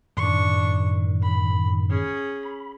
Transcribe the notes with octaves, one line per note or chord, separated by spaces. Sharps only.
F#2 A2 D#3 D4 C#6
B5
C#4 G#4
B5